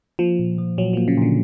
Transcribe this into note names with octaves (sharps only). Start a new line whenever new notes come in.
F3 A#3
A#2
F3
A#2 F#3
F3
A#3
C#3
A#2 D3